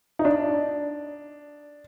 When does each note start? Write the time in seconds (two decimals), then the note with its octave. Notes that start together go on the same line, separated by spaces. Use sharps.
0.19 D#4
0.25 D4